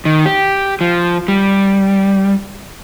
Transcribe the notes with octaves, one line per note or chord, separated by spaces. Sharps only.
D#3
G4
F3
G3